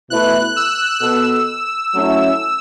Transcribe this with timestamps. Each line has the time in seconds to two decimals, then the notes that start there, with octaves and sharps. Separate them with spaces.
0.10 B2 A3 E4 B4 F#6
0.56 E6
1.01 B2 B3 A4 E6
1.94 F#3 A3 C#4 E4